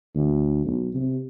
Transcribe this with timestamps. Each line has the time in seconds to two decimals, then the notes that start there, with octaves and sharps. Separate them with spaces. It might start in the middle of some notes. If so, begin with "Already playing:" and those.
0.15 D2
0.65 B1
0.94 C3